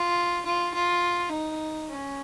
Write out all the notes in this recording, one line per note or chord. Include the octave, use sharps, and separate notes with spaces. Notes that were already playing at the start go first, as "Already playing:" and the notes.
Already playing: F4
F4
F4
D#4
C#4